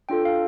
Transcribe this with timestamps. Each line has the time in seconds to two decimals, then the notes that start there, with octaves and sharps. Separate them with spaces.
0.09 D4 F4 A4 G5
0.25 F5